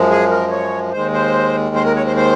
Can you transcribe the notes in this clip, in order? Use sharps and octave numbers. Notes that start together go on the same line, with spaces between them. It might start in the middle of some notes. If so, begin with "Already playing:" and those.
Already playing: F#2 F3 G#3
G#4
A#4
C#5
D#2 D#3 G#3 C5
C5
C5
A#4
C#5
C5
C5